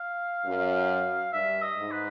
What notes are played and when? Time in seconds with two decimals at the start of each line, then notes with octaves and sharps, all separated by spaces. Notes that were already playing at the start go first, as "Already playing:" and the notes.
Already playing: F5
0.46 F#2
1.33 G2 E5
1.62 D#5
1.77 G#2
1.91 B4